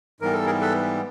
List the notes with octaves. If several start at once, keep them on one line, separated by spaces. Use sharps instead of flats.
G#2 E3 G3 B3 A#4
A4
G#4 A#4
A4 B4